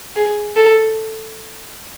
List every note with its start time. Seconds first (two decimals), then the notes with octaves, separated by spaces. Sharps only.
0.16 G#4
0.56 A4